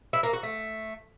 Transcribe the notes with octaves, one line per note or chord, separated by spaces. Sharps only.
E4
A#3
F#4
A3